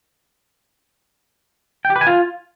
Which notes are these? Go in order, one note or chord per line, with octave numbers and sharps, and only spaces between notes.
G5
G4
B4
G#5
F4